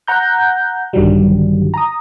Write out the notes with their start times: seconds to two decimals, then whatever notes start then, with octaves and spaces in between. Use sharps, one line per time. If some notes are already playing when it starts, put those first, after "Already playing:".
0.08 F#5 A#5 G6
0.93 A#1 G2 D3 D#3 F#3 G3
1.74 A#5 D#6